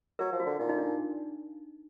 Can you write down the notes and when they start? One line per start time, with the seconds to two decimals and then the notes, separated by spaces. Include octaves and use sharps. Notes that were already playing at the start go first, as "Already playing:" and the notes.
0.19 F#3 A#4
0.32 F3
0.40 F#4
0.46 D3
0.59 A#2 D#4
0.69 D#4
0.78 D4